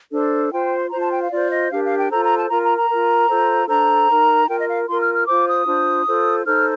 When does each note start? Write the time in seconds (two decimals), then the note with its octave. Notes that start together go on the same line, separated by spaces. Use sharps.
0.12 D4 A4 C5
0.52 F4 C5 G5
0.91 F4 C5 A#5
1.01 A5
1.11 G5
1.21 F5
1.31 F4 C5 D5
1.51 D#5
1.71 D4 G4 A#4 F5
1.84 F5
1.97 G5
2.10 F4 A4 C5 A#5
2.24 A#5
2.37 A5
2.50 F4 A#4 A#5
2.63 A#5
2.77 A#5
2.90 F4 A#4
3.29 F4 A4 C5
3.69 D4 A4 C5 A#5
4.09 D#4 A#4
4.48 F4 A#4 G5
4.58 D#5
4.67 F5
4.88 F4 A#4 C6
5.01 F6
5.14 F6
5.27 F4 C5 D6
5.47 D#6
5.67 D4 F4 C5
6.06 F4 A4 C5
6.46 D#4 A4 C5 F6